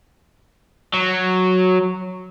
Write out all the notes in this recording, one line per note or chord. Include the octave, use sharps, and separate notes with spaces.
F#3